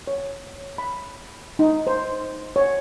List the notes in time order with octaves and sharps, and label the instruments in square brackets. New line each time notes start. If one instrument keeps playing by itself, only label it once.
[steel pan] C#5
B5
D#4
C5
C#5